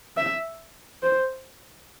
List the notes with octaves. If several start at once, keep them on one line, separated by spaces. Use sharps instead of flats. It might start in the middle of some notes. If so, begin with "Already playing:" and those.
E5
C5